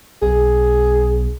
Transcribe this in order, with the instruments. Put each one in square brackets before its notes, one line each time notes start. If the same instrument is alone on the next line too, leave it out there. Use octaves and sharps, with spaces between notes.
[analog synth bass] B1 [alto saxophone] G#4